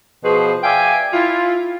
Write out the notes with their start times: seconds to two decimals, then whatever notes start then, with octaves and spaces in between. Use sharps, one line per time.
0.24 B2 F3 G#4 B4 C5
0.63 D5 E5 F5 G5 G#5
1.13 E4 F4